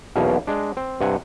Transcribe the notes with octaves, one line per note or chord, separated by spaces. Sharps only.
B1 E2 B2 A#3 C#4
G#3 D4
C4
G2 C3 F#5 G#5